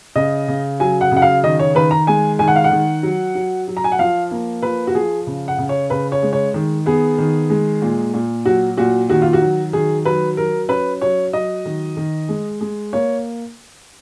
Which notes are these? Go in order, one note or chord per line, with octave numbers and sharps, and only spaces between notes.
C#3 D#5
C#3
F#3 G#5
F#5
C#3
F#5
F5
D#3 D#5
C#5
D#3 B4
A#5
G#3 G#5
D#3 G#5
F#5
F5
F#5
D#3
F#3
F#3
F#3
A#5
G#5
F#5
F3 F5
A#3
F3 B4
F#4
F3 G#4
C#3
F#5
C#3
C#5
C#3 B4
C#5
G#3
C#5
D#3
B3 G#4
D#3
G#3
A#2
A#2
F#3 F#4
A#2 F#4
D#3 F#4
F4
F#4
F#3
D#3 G#4
F#3 B4
F#3 A#4
C#4 B4
F#3 C#5
F#3 D#5
D#3
D#3
G#3
G#3
A#3 C#5